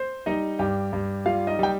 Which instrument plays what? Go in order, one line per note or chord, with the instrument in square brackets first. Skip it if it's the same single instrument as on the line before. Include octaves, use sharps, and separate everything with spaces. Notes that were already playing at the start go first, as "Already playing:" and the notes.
Already playing: [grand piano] C5
G3 D#4 D#5
G2 G4 G5
G2
G3 F4 F5
D#4 D#5
G3 G5